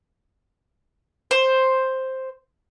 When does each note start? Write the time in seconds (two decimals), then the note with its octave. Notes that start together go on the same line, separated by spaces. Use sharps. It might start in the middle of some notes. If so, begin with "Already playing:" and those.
1.31 C5